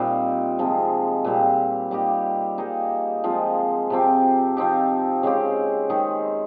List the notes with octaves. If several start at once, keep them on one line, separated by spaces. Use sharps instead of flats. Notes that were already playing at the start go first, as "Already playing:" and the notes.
Already playing: A#2 G3 C4 D#4
C3 F3 G#3
A#2 G3 C4
G3 A#3 D#4 G4
G3 A#3 D#4 G#4
F3 G#3 C4 F4
C3 F3 C4 G4
F3 C4 D#4 G4
C#3 G#3 C4 G4
D#3 G#3 D#4 G#4